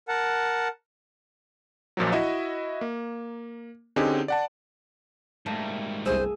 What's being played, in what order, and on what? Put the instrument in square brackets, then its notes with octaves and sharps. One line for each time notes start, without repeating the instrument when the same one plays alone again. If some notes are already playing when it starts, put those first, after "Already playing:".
[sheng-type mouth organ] A#4 F#5 A5
[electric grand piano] A#1 A#2 F3 F#3
E4 F#4 D#5 E5
A#3
D3 C4 C#4 D#4 G4 G#4
D5 F#5 A5
[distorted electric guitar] G#2 G3 [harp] A3 A#3
[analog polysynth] G1 C2 [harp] G#4 E6 D#7 [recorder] C5